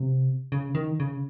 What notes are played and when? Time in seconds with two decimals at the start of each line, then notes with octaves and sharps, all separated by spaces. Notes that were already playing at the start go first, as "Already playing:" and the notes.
Already playing: C3
0.52 C#3
0.75 D#3
1.00 C#3